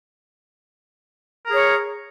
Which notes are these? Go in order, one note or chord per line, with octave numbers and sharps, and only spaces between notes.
G#4 A#4 C#5